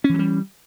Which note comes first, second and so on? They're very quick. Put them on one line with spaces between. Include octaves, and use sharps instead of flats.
C#4 E3 F#3 G3